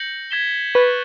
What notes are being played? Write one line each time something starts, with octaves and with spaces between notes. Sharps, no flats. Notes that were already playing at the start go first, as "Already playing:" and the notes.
Already playing: G6 A#6 C#7 F#7
G#6 B6 E7 G7
B4 C#6 F#6 A6